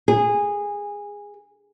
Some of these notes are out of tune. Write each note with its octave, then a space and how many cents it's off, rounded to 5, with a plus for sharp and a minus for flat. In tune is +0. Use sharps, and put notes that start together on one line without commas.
G#4 -20